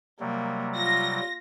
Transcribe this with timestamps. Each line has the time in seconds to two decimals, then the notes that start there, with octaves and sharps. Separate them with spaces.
0.20 C3 F#3 G3 A#3
0.76 F4 A#6